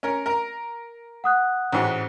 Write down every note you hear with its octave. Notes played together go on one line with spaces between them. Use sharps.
C#4 A#4
A#4 A#5
F#5 D#6 F#6
A1 G#2 F#4